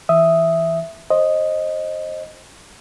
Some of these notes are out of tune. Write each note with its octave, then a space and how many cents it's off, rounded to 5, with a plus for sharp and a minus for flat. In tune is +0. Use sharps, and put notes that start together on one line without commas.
E3 +0 E5 +0 D#6 +0
C5 +25 D#5 +0